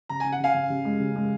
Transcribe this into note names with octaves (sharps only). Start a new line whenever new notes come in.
C#3 A#5
C#3 G#5
F#5
C#3 F5 G#5
C#3
C#3
G#3
C#3
G#3